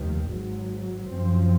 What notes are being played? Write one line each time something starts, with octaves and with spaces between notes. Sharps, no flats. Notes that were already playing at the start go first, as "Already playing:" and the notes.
Already playing: F1 D#2 D#3
G#1 G#2 F#3
F#2 F3 C4